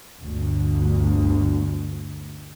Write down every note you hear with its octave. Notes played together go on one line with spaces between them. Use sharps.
G1 D2